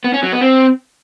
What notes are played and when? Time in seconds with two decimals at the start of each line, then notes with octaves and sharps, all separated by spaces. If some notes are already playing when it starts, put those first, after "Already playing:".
0.04 B3
0.14 C#4
0.23 F#3
0.32 B3
0.41 C4